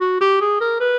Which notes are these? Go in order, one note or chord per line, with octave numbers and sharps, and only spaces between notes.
F#4
G4
G#4
A#4
B4